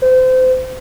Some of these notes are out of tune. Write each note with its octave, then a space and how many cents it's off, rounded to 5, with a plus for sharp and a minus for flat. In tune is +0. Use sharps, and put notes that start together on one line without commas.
C5 -30